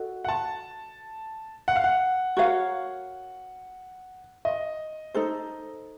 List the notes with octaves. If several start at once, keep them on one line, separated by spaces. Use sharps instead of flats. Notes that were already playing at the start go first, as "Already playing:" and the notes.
Already playing: F#4 A4 D#5
F#5
A5
F#5
F5
F#5
F#4 A#4 C#5 F5
D#5
D#4 A4 C5